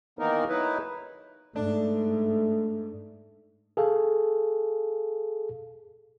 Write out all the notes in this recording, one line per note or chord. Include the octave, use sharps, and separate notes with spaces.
D#3 E3 A#3 B3 D#4 A#4
F#3 D#4 E4 B4
G#2 A3 D4
G#4 A4 F5